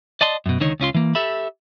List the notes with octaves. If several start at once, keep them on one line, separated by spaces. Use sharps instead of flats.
D5 D#5 A5 C6
F#2 B2
C#2 D3 D#3 D#4 C#5
C#2 C#4 F4 C6
E3 A#3
G4 A4 E5 B5